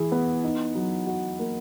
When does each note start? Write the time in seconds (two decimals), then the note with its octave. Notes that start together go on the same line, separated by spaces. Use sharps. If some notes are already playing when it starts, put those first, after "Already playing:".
Already playing: E3 G#4
0.12 B3
0.44 D#4
0.75 F#3
1.07 F#4
1.39 A#3